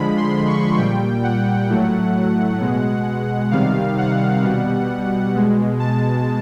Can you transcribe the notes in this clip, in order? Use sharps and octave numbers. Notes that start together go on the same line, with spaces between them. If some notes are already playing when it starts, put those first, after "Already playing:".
Already playing: D3 F3 G#3 B5
C6
C#6
A#2 G3 G5
F#5
A2 F#3 A3
B2 G#3
C3 D#3 G3 F5
F#5
B2 G3
B2 G#3
A5